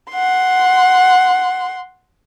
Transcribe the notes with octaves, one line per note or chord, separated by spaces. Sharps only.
F#5 C6